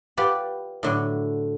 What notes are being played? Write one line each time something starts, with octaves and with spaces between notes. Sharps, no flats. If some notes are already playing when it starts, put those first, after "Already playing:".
F4 G4 B4 D5 F#5
A2 D3 F#3